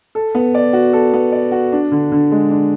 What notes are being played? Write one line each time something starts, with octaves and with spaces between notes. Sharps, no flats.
A4
B3
D5
F#4
A4
B3
D5
F#4
D4
D3
D3
G#3
D4